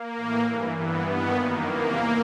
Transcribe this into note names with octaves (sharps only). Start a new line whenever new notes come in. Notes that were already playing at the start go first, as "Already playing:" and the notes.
Already playing: A#3
A2 E3
G2 E3
G2 E3 B3
G2 D#3 B3
F#2 D#3 A#3
E2 C3 E3